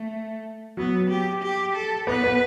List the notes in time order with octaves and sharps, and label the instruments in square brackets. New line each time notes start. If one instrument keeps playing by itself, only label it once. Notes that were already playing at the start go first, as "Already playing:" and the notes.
Already playing: [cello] A3
[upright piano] F#3 [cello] B3
[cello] G4
G4
A4
[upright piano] B3 [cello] B4
[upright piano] B3